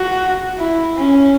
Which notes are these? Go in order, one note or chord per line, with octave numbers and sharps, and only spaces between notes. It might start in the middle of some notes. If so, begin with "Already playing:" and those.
Already playing: F#4
E4
C#4